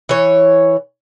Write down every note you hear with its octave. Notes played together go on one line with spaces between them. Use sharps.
E3 C#5